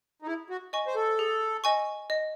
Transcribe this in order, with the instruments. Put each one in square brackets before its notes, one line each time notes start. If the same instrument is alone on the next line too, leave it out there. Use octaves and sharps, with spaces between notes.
[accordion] D#4
[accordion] E4 [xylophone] G#4
[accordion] F#4
[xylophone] D#5 G#5 C#6
[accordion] C5
A4
[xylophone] G#4
D#5 G#5 C#6
D#5